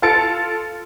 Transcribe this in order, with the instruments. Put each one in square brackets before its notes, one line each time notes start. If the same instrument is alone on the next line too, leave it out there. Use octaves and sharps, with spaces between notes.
[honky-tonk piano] F4 A4 A5 A6 C#7 D7